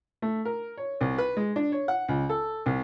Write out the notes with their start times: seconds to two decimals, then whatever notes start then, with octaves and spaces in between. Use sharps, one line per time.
0.22 A3
0.45 A#4
0.77 C#5
1.01 C2
1.18 B4
1.37 G#3
1.56 D4
1.72 C#5
1.88 F#5
2.08 C#2
2.30 A4
2.66 C2